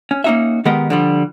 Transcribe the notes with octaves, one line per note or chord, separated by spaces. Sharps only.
C#4
A#3 C#4 D#4 F#4 E5
D#3 G#3 B3 G4 A#4 D#5
D3 F3 G3